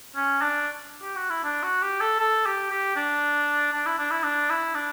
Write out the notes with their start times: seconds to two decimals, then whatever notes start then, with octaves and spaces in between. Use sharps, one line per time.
0.16 C#4
0.41 D4
1.02 G4
1.16 F#4
1.30 E4
1.44 D4
1.63 F#4
1.82 G4
2.01 A4
2.19 A4
2.46 G4
2.70 G4
2.96 D4
3.73 D4
3.86 E4
3.98 D4
4.11 E4
4.23 D4
4.50 E4
4.75 D4